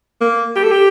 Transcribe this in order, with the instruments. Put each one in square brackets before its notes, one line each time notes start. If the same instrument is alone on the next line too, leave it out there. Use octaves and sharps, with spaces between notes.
[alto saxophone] A#3
G4
A4
G4